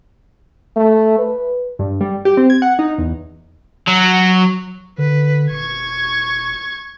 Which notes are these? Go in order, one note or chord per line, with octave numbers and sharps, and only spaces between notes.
A3
B4
G2
G3
G4
C4
G#6
F#5
D#4
E2
F#3
D3 B4
D#1 C#6 G#6